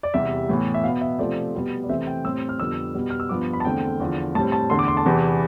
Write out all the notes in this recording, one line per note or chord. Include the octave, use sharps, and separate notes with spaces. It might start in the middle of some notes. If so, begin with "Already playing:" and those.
D5
E2 C3 G3 E5
A2 E3 B3
E5
B2 F5
B3
E5
C3 F3 A3 C4 D5
B2 G3 B3
D5
C3 E3 A3 C4 E5
G5
A2 G3 C4 E6
F6
F2 D3 G3 B3 E6
B2 G3 B3
F6
E6
G2 F3 B3 D6
B5
A5
E2 D3 A3 C4 G5
E2 D3 F3
A2 G3 C4 A5
A5
E2 D3 A3 C6
D6
C6
A5
E2 C3 E3 B3